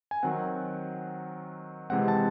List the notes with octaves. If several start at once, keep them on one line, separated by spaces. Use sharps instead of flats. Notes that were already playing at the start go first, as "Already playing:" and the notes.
G#5
D#3 F#3 C4 F#5
C3 E3 G#3 C4 F#5
A5